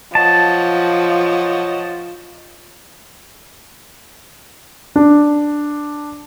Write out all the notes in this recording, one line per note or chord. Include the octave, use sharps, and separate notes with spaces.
F3 C#5 D#5 F#5 A5
D4